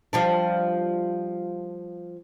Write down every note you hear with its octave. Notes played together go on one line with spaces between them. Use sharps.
F3 G3 D4